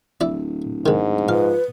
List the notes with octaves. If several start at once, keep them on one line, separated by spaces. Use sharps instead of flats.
D1 E4 D5
G#2 D#3 G#3
F3 B4 F5